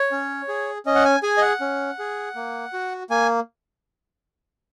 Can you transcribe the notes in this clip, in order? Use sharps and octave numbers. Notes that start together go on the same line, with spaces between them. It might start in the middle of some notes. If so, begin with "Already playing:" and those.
Already playing: C#5
C#4
G#4
C#4 D#5
F#5
G#5
G#4 G#5
D#5
F#5
C#4
G#4
A#3
F#4
A#3 G#5